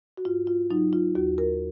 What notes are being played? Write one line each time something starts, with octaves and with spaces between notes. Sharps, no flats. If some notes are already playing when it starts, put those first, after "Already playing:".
F#4
G#2 F4
F4
F#3 D#4
F4
D#2 F#4
A#4